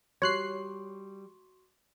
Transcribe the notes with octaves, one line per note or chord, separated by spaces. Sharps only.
G3 F#4 C#5 C6 C#6 F#6 C7